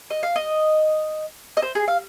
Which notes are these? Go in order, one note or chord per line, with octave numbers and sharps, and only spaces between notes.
D#5
F5
D#5
D#5
C5
G#4
F5